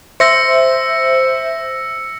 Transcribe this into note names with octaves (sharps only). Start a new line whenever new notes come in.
C5 E5 E6 A#6 C#7